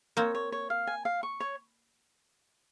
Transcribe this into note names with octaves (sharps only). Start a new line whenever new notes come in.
A#3 C4 C#5
C#5
C#5
F5
G#5
F5
C#6
C#5